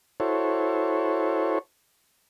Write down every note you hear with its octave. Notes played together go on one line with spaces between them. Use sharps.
E4 F#4 A4 C5 C#5